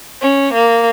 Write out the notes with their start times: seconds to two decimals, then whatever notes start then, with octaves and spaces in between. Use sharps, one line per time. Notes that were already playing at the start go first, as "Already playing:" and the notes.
0.21 C#4
0.53 A#3